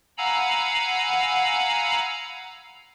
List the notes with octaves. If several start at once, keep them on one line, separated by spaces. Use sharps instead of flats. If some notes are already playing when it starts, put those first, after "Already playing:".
F5 F#5 G#5 A#5 B5 E6